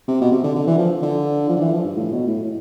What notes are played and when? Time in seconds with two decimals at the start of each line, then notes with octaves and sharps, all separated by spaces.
0.08 C3
0.21 B2
0.32 C3
0.44 D3
0.56 D3
0.67 E3
0.79 F3
1.02 D3
1.49 F3
1.56 D3
1.61 E3
1.73 F3
1.85 G2
1.96 A2
2.12 B2
2.27 A2
2.44 A2